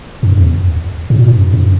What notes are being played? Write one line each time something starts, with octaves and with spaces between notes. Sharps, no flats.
F#2
E2
G#2
B2
G#2
F#2
F#2